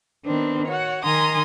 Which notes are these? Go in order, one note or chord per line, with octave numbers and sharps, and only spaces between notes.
D#3 B3 C4 D4
F#4 C#5 F#5
D#3 G#5 A#5 C6 D#6